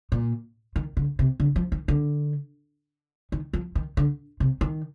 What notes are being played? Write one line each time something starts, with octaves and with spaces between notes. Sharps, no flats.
A#2
D#3
D3
C3
D3
F3
D#3
D3
D#3
F3
D#3
D3
C3
D#3